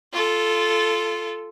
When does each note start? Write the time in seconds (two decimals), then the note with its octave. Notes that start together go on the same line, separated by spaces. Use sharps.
0.13 F4 A4